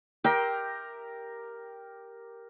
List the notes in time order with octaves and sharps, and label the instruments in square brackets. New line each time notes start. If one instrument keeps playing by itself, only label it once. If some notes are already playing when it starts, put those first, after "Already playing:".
[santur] G4 A#4 A#5 [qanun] E5 G5 C6